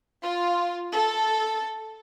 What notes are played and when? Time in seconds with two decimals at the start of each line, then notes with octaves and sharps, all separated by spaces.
0.24 F4
0.93 A4